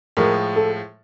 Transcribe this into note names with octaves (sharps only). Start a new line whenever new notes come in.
A2 F3 G#3 A#4
A4